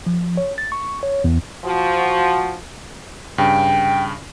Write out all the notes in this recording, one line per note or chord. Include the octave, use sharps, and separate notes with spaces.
F3
C#5
A6
C#6
C#5
E2
F3 F#4
G2 C#3 G5